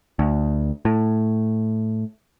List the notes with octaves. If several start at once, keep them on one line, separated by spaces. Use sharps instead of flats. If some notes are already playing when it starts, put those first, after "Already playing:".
D2
A2